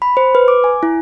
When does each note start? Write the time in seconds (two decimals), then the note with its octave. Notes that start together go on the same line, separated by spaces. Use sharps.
0.02 B5
0.17 C5
0.35 B4
0.48 D6
0.64 G#5
0.83 E4